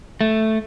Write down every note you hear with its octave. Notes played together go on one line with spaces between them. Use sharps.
A3